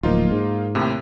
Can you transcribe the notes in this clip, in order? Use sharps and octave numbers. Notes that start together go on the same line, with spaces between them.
D1 F3 A#3 D#4 F4
G#2
D#2 A2 C3